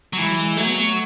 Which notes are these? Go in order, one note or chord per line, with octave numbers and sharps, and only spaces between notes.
F#3
E3 G#3
F#3
G#3
F#3 A3
B3
A3